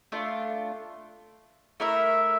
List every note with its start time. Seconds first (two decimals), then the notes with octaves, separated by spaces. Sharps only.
0.12 A3 D4 F4
1.80 A3 E4 A#4 E5